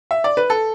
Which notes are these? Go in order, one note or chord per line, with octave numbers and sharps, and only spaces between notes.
E5
D5
B4
A4